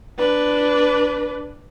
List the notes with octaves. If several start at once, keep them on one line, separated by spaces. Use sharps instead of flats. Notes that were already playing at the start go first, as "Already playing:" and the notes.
D4 B4